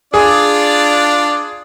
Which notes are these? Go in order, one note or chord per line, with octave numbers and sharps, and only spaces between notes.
D4 F4 G#4 D5